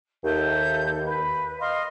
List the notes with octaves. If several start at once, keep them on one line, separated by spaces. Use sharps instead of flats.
D#2 A4 E5 G6
B4
D#5 F5 C6